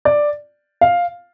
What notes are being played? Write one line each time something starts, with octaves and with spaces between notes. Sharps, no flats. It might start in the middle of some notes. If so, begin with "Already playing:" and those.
D5
F5